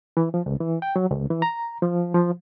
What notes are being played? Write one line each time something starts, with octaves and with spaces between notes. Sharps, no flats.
E3
F3
C#2
E3
G5
F#3
C#2
E3
A#5
F3
F3